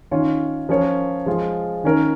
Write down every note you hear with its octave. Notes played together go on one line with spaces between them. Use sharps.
D#3 C#4 F4 C#5
F3 C#4 A#4 C#5
F3 G#3 F4
D#3 C#4 A#4 C#5